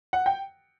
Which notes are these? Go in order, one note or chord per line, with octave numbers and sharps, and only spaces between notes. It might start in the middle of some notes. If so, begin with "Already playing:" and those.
F#5
G5